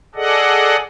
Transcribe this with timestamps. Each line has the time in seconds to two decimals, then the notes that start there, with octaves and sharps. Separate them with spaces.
0.15 G#4 A4 D5 D#5 F#5